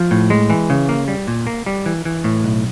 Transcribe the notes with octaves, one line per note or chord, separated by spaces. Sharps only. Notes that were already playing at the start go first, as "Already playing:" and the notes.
Already playing: F3
A2
G#3
E3
C#3
A#3
G3
A#2
A#3
G3
E3
E3
A2
B1